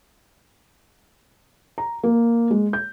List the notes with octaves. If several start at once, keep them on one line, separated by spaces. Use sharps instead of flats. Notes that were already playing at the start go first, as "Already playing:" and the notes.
A#5
A#3
G#3
G6